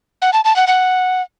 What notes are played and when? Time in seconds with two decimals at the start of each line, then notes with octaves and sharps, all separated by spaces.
0.22 F#5
0.33 A5
0.45 A5
0.56 F#5
0.67 F#5